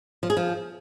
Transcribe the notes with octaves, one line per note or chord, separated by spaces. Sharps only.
F3
G#4
F3